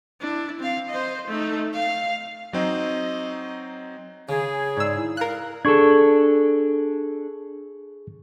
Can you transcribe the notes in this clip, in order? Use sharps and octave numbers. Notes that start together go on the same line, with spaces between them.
D4 E4
C4 F5
C5 D#5
A3 D#4
F5
F#3 C4 D#4 D#5
C#3 G#4
G#2 D5 E6
E4
A#4 F5 F#6
D4 G#4 A4 C#6 G#6